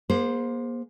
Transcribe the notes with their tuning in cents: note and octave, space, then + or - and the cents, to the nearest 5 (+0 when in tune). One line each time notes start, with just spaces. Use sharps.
A#3 +35 G#4 +0 C5 +0